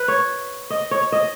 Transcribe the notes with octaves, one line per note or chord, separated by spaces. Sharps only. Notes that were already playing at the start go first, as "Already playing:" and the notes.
Already playing: B4
C#5
D#5
C#5
D#5